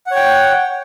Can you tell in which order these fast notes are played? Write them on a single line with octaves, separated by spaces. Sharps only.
F#5 C#5 G5